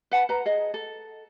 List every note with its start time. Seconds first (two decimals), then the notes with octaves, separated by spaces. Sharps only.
0.11 B4 F#5 A5
0.29 B4 A#5
0.46 G#4 D#5
0.74 A4